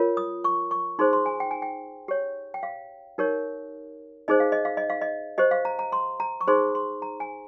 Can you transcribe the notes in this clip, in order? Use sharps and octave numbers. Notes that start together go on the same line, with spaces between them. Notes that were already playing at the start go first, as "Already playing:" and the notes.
Already playing: F4 A#4 C#5
D#6
C#6
C#6
D#4 G#4 C5 C6
C6
G#5
G5
G#5
G5
G4 C#5
G5
F5
D#4 G4 A#4 C#5
D#4 G#4 C5 D#5
F5
D#5
F5
D#5
F5
D#5
G4 C5 D#5
F5
A#5
A#5
C6
A#5
C#6
D#4 G#4 C5 C6
C6
A#5
G#5